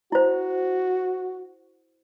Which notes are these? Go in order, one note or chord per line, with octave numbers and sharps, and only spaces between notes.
E4 F#4 C5